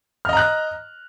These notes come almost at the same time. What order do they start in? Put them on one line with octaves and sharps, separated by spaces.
F6 D#5 A#5 F#6